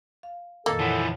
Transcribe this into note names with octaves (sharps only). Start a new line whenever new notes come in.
F5
F2 A#2 D#3 A#3 A4
E3 F3 C#5 F#5 A5